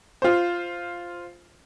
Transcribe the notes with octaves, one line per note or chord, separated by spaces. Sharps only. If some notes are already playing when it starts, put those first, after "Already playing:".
F4 C5